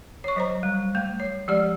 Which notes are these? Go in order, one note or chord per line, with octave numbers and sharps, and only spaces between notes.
C#5 C#6
F#3 C5 A#5
G3
A3 F5
C#5
F3 G#3 G4 D5